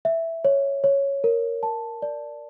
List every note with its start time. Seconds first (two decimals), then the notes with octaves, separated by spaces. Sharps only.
0.05 E5
0.45 C#5
0.84 C#5
1.24 A#4
1.63 A5
2.02 D5